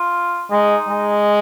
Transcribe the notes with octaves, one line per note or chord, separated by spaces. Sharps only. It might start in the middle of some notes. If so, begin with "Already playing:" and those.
Already playing: F4
G#3 D#4
G#3